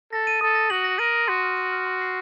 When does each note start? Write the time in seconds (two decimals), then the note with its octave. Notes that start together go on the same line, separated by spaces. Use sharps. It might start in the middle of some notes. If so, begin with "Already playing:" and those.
0.12 A4 A#6
0.27 D#7
0.41 A4 D#6
0.55 A#6
0.70 F#4 F#7
0.84 A#6
0.99 A#4 D#7
1.13 D#6
1.28 F#4 C6
1.42 F6
1.57 D#7
1.72 F6
1.86 C6
2.01 C7